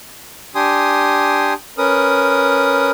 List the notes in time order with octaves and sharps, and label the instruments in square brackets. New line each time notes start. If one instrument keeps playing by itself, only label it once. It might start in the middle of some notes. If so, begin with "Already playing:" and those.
[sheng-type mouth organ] D4 G4 G#5 C6 D#6
C#4 A#4 B4 D#6